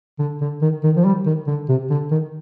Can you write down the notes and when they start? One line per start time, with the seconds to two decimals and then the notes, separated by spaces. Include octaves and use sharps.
0.19 D3
0.41 D3
0.62 D#3
0.83 D#3
0.97 F3
1.05 G3
1.26 D#3
1.47 D3
1.69 C3
1.90 D3
2.11 D#3